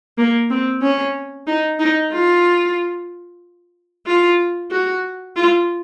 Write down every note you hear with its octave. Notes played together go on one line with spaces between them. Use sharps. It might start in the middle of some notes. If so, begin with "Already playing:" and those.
A#3
C4
C#4
D#4
D#4
F4
F4
F#4
F4